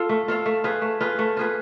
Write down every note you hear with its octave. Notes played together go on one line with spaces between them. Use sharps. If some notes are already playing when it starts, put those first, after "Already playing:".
Already playing: F4 A4 F5
A3
F4 A4 F5
A3
F4 G#4 B4
A3
F4 G#4 B4
A3
F4 G#4 B4